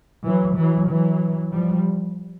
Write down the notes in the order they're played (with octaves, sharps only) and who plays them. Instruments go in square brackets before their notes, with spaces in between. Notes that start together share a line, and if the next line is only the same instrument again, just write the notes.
[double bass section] E3 F#3
E3 F#3
E3 F#3
F3 G3